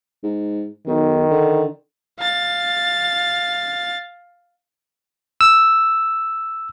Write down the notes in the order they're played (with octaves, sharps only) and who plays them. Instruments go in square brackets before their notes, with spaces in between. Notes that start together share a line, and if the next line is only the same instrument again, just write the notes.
[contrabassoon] G#2
[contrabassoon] B1 [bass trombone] D#3
[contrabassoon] D3
[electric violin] F5 A6
[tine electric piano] E6